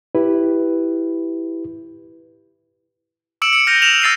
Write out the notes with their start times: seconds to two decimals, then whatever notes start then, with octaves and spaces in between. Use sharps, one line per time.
0.15 E4 G4 B4
3.42 D6 E6 C#7 D7 E7 F#7
3.53 C#7 D7
3.67 F6 G6 A#6 D#7 F7
3.82 E7 F7
4.02 E6 A6 C7 D#7